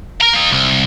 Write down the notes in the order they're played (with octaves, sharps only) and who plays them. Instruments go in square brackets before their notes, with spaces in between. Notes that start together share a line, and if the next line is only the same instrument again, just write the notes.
[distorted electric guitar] A#4 A#5
A#3 D#4
C2